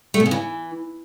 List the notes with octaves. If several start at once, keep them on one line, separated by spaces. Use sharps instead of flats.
A3
B2
C#3
E3